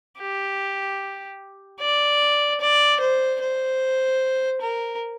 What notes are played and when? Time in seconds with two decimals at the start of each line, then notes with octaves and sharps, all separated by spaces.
0.19 G4
1.81 D5
2.61 D5
3.01 C5
3.41 C5
4.62 A#4